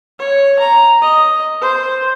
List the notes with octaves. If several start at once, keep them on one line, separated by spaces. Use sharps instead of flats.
C#5
A#5
D#5
C5